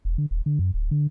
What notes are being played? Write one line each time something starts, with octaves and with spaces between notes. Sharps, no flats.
E1
D3
D#1
D3
F#2
D1
D3